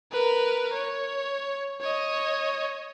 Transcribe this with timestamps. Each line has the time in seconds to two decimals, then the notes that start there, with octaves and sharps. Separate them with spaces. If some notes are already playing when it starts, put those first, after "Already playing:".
0.11 A#4 B4
0.73 C#5
1.81 C#5 D#5